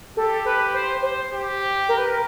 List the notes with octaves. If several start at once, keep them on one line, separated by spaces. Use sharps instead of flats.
G4 A4
B4
C5
C5
G4
A#4
B4
A#4